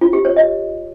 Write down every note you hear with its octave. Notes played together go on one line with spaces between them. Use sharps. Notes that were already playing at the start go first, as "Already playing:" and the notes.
F4
G4
C#5
D#5